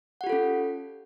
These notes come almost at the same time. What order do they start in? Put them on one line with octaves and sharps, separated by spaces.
F#5 G4 F4 A4 C#4